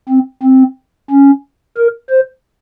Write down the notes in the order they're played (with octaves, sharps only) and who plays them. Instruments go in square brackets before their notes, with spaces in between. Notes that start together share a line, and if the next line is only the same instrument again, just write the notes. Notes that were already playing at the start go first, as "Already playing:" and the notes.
[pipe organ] C4
C4
C#4
A#4
C5